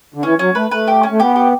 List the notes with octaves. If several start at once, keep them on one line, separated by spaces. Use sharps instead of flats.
D3
E3 C#4
F#3 C#4
A3 B4
A3 B4
G4
C#4
A3
B3 G4
G4